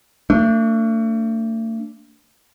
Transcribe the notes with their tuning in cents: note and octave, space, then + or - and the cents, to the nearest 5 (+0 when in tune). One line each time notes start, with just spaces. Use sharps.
A3 +40 D4 -10